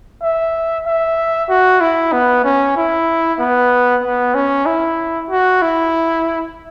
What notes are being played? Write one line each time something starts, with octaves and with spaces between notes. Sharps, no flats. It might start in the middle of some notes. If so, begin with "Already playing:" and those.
E5
E5
F#4
E4
B3
C#4
E4
B3
B3
C#4
E4
F#4
E4